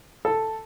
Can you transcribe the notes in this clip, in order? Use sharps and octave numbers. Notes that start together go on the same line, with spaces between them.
A4